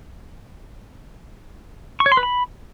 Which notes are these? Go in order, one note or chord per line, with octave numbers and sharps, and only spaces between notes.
C#6
C#5
C6
B4
B5